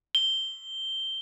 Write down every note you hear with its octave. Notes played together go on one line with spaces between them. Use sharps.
G7